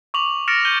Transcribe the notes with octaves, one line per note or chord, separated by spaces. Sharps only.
C#6 D6 F7 F#7
F6 A6 A#6 C#7 D7 E7
G6 C#7 D#7 F#7 G7